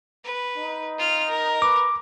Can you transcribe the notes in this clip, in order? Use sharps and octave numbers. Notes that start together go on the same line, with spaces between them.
B4
D#4
F4 F6
A#4
B4 D6